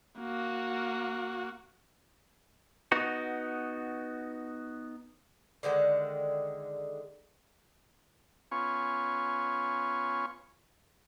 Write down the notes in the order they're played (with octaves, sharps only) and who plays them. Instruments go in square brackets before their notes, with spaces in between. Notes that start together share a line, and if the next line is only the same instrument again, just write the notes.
[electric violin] A#3 F#4
[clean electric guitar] B3 D#4 F#4
[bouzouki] D3 D#3 G#3 F#5
[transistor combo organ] B3 C#4 F4 G#5 C#6